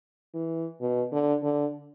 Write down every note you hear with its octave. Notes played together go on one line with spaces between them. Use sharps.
E3
B2
D3
D3